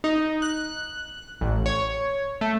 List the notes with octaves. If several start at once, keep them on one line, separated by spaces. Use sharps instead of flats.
D#4
F#6
A1
C#5
A3